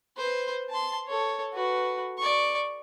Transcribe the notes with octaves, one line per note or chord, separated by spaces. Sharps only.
B4 C5
A5 C6
A4 C#5
F#4 B4
D5 C#6